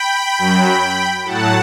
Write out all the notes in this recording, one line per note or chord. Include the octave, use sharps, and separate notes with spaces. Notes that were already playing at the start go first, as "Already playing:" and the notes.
Already playing: G5 B5
F#2 F#3
A2 F#3 F#5 A5